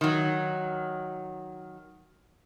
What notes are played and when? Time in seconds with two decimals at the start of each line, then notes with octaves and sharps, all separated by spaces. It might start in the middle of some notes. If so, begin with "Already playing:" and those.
0.01 D#3 F#3